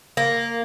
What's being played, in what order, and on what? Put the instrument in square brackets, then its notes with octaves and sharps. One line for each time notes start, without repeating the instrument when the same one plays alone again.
[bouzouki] A#3